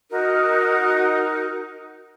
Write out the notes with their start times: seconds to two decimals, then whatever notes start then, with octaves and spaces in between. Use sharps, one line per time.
0.11 D#4 F#4 A#4